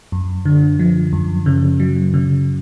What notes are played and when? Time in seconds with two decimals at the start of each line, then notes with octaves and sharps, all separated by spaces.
0.12 F#2
0.45 D3
0.79 F3
1.13 F#2
1.46 C#3
1.80 F#3
2.14 C#3